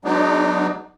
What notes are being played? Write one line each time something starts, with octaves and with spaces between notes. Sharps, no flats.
F#3 G#3 B3 D4 D#4